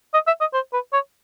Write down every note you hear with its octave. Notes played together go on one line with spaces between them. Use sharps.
D#5
E5
D#5
C5
B4
C#5